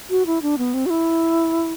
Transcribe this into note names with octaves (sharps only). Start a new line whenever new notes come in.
F#4
E4
D4
B3
C4
F#4
E4